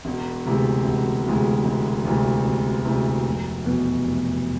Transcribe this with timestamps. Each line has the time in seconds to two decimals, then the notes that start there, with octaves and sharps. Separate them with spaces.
0.05 E1
0.45 D2 C3 E3 G#3
0.84 E1
1.25 D2 C3 E3 G#3
1.65 E1
2.05 D2 C3 E3 G#3
2.45 E1
2.85 D2 C3 E3 G#3
3.25 F1
3.65 E2 B2
4.05 F1